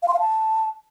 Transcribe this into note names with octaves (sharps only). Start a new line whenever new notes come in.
F5
C6
F5
A5